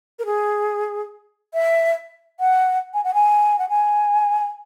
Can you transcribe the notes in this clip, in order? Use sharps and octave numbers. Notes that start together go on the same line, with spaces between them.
A#4
G#4
E5
F#5
G#5
F#5
G#5
F#5
G#5